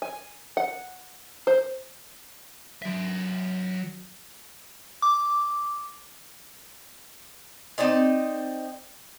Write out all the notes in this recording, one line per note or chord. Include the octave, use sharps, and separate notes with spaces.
G#5
F#5
C5
F#3 E5
D6
C4 D#4 D5 D#5